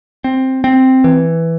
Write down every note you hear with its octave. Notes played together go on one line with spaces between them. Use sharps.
C4
C4
E3